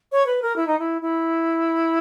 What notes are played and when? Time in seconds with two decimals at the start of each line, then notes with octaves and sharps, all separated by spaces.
0.12 C#5
0.26 B4
0.42 A#4
0.56 E4
0.67 D#4
0.79 E4
1.01 E4